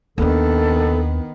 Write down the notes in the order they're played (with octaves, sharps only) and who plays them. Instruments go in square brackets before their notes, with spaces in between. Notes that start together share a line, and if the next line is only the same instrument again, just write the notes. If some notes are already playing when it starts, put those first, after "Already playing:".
[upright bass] D#2 D4 [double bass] D#3 B3 [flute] A4